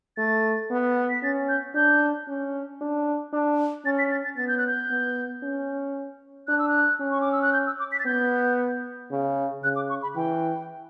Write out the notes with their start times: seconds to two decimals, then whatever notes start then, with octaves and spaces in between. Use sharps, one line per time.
0.17 A3 A6
0.70 B3
1.10 B6
1.23 C#4 A6
1.49 G6
1.75 D4 G6
2.28 C#4
2.81 D4
3.33 D4
3.86 C#4 A6
3.99 B6
4.11 A6
4.25 A6
4.37 B3 A6
4.48 G6
4.58 F#6
4.67 G6
4.90 B3
5.43 C#4
6.48 D4 F#6
6.59 E6
6.69 F#6
7.00 C#4
7.11 C#6
7.21 D6
7.32 E6
7.42 F#6
7.53 G6
7.67 E6
7.79 D6
7.92 B6
7.99 A6
8.05 B3 G6
9.11 C#3
9.64 C#3 F#6
9.76 D6
9.89 C#6
10.03 B5
10.16 E3 G5